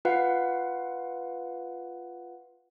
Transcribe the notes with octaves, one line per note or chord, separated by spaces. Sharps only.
F4 B4 F5 F#5